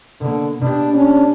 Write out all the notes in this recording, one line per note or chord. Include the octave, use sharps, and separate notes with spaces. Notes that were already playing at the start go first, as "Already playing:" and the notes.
B2 D3 A#3
B2 D4 G4
C#4 D4